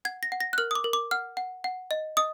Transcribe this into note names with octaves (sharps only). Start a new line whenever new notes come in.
F#5 G#6
A#6
F#5
A#6
F#6
A#4 F6
D#6
D6
A#4
D6
F#5 F6
F#5
F#5
D#5
D#5 D#6